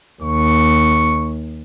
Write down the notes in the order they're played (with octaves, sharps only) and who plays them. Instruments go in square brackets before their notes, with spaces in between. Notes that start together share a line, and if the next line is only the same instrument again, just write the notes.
[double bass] D#2 [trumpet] C#6